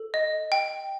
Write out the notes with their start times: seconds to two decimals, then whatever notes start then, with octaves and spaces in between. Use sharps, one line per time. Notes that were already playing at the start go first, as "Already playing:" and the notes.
Already playing: A4
0.14 D#5
0.52 G5